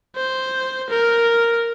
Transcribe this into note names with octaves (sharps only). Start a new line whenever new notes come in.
C5
A#4